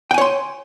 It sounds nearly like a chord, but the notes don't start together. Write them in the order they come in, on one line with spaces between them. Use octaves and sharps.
G5 G#5 C#5 C6